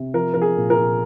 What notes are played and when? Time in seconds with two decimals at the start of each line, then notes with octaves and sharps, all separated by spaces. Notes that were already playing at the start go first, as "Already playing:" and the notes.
Already playing: C3
0.14 F3 A#4
0.34 F3 A#4
0.42 G#4
0.57 A#2
0.70 A#4
0.77 A#2